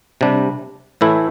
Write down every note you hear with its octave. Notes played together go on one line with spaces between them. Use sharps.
C3 G3 D4
A2 E3 A3 E4